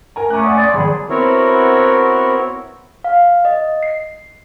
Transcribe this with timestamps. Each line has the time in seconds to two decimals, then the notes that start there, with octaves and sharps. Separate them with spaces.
0.16 A#4 G#5 A#5
0.30 A3 C#4 G#5 A#5 D6 F#6
0.43 D5 F#5 D#6
0.57 D5 C6 D#6
0.74 G#1 D3 F3 F#3 G#4 B5 C6
1.10 B3 C4 E4 F#4 A#4 C#5
3.04 F5
3.45 D#5
3.83 C7